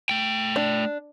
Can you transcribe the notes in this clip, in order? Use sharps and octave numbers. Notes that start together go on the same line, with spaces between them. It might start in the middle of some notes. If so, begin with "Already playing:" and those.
A3 G5
D4